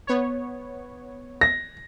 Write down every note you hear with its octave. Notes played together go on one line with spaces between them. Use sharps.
B3 C#5
A#6